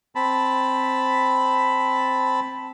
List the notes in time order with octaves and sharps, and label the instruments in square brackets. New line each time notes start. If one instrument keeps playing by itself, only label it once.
[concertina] C4 A5 B5